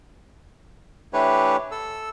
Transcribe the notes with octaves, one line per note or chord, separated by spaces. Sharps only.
E3 A3 D4 G4 B4 C#5
A4 E6